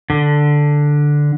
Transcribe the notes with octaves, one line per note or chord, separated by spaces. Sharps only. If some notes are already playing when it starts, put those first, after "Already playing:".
D3